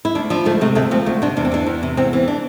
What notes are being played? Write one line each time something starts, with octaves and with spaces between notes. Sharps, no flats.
E4
D2 D4
F3 D4
D2 A3
C3 A3
D2 A3
F3 C4
D2 A3
C3 D4
E2 D4
C4
E3 D4
E2
C3
E2 C4
E3
D4